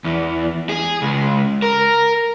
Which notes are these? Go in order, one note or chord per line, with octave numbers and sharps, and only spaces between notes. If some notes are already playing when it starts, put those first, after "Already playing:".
E2
G#4
C#2
A#4